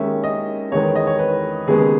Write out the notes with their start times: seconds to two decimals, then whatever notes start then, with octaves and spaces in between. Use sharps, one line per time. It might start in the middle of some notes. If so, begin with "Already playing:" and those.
Already playing: D#2 D#3 G#3 C#4 E5
0.24 D#5
0.72 E2 D#3 G#3 B3 C#5
0.96 D#5
1.07 C#5
1.19 B4
1.67 D#2 C#3 G#3 B3 G#4